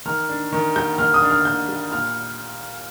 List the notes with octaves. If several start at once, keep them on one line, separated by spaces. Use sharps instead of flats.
D#3 F6
D4
D#3
G3 G6
D#3 F6
D#6
D4
F6
D#3 G6
G3
A#2 F6